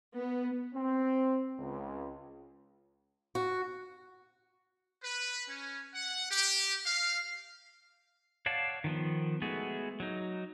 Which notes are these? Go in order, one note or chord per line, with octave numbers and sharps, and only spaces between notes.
B3
C4
C#2
F#4
B4
C#4
F#5
G4
F5
C#5 D5 F5 F#5 A5
D#3 F3 B3
G#3 A3 B3 F#4 G#4
F#3 D#4